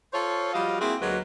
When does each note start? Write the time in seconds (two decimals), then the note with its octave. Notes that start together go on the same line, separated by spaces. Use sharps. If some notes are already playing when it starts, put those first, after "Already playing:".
0.13 F4 A4 C5 C#5
0.54 F3 G3 F#4 D#5 F5
0.80 A#3 C4 E4 F#4 G#4
1.01 D2 F#3 G#3 A#3 F#4 B4